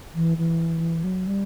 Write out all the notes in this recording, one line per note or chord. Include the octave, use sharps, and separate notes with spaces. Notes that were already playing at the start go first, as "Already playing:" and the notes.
E3
E3
F#3
G3